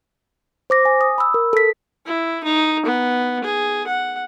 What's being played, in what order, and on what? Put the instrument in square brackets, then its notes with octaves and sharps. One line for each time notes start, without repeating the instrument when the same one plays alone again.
[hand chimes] C5 D6 A#6
G#5
D#6
B5 E6
A#4
A4 B6
[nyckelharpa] E4
D#4
B3
G#4
F#5